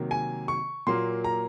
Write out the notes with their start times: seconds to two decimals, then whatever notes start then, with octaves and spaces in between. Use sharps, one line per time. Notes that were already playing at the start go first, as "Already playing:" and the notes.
Already playing: C3 D#3 F#3 A#3
0.11 G#5
0.48 C#6
0.87 A#2 F#3 A#3 C6
1.24 A#5